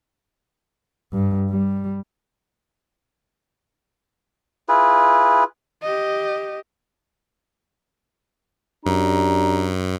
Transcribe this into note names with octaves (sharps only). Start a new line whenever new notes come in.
G2
G3
E4 F4 G#4 B4
G4 D#5
F#2 D4 G4 A#5